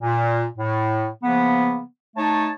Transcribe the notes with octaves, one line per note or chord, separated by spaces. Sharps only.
A#2
A2
C#3 F3 A#3 B3
A3 D#4 C#5 A5